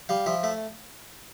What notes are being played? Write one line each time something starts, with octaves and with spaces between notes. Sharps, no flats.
G3 F5
F3 E5
A3 E5